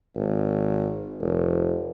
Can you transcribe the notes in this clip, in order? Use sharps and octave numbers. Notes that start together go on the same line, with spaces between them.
G#1
F1